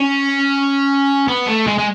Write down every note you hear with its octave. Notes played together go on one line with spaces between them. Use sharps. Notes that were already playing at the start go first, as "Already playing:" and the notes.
Already playing: C#4
B3
A3
G#3
G#3